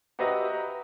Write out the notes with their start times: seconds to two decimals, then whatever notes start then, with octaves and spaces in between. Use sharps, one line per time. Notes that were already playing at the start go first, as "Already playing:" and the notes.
0.19 F#4 G4 B4 D#5 E5 A#5